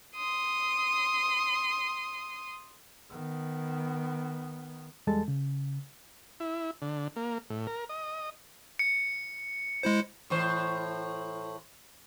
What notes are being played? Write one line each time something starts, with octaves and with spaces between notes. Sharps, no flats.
C6 D#6
D#3 B3
E2 G3 G#3 A4 A5
C#3
E4
D3
A#3
A2
A#4
D#5
C#7
G#3 E4 C5
A2 E3 C5